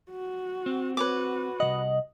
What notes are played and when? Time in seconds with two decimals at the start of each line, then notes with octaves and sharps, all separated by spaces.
0.11 F#4
0.66 C4
0.97 F#4 B4 C#5 D6
1.60 C2 C#3 D#5 F#5